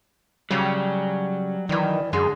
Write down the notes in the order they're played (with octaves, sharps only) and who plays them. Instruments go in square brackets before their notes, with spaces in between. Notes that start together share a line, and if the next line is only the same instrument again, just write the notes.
[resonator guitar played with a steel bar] C#3 C#4 [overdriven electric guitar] F#3 [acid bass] G3
[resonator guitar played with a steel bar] G2 E3 [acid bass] D#3 [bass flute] D5
[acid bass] F#2 [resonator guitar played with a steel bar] D3 G#3 [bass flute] G#4